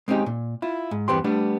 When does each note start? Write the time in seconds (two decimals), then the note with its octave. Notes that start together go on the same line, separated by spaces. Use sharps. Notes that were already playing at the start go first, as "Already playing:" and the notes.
0.08 G#3 C4 C#4 D#4 G4 G#4
0.26 A#2
0.62 E4 F4
0.91 G#2
1.08 E2 G2 B3 C4 G4 C6
1.24 G3 A3 B3 D4